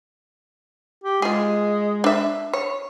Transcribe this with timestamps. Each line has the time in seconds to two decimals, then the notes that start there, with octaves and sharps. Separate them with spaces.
1.04 G4
1.22 G#3 F4 G#4
2.04 D4 E5
2.53 C#5